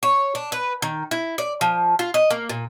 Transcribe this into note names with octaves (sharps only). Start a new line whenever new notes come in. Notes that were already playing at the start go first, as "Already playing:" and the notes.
C#5
D4
B4
D#3
E4
D5
F3
F4
D#5
A#3
A#2